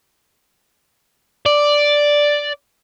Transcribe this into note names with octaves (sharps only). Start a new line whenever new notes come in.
D5